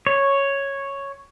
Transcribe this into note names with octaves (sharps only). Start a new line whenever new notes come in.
C#5